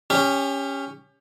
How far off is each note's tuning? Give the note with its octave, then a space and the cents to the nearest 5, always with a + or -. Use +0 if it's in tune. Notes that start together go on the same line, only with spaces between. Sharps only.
C#4 +0 G4 +30